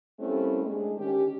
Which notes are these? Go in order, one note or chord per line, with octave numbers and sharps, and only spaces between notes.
G3 A3 A#3 C4 C#4 E4
A2 G#3 D4
D3 D#3 C#4 G4